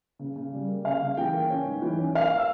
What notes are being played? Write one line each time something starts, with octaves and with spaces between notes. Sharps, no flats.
C#3
C#3
G3
A#3
C#3 F5
C#3
E3 G5
A#3
C#4
G#2
E3
C#4
A#3 F5
E6